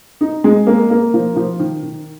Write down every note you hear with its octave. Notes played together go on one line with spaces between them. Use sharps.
D#4
G#3
A#3
A#3
F3
F3
D#3
D#3